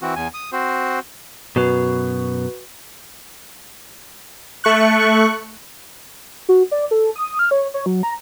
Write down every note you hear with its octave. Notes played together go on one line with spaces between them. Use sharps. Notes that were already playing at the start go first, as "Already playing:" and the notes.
E3 C4 F#4
E2 G#5
D#6
C4 F#4 C5
F#2 B2 F#4 B4
A3 C#6 F#6
F#4
D5
A4
D#6
F6
C#5
C#5
F#3
A#5